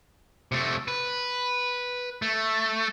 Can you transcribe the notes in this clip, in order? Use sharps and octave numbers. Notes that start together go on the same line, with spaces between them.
C3 A3
B4
A3